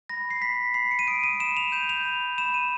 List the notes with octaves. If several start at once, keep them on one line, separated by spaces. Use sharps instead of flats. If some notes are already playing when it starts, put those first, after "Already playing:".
B5 A#6
C7
B5 B6
B5 C7
C#7
D#7
D#6 D7
D#7
B5 E7
F7
G6 E7
F7
B5
B5 E7
D#7